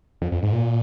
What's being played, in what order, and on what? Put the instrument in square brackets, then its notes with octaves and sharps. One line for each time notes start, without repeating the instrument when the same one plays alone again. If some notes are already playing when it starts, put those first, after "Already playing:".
[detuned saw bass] F2
F2
G#2
A#2